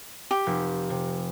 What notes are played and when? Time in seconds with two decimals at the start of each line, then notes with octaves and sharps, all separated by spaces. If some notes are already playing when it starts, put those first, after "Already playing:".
0.31 G4
0.46 F1
0.90 C3